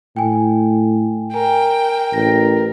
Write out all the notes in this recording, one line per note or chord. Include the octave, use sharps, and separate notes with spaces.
A2 G5 G#5
A#4 G5 G#5
A1 A#6